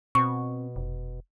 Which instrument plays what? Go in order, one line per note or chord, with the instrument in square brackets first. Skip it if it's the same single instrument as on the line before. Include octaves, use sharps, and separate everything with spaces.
[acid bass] B2 [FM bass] C4 [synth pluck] C#6
[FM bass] F1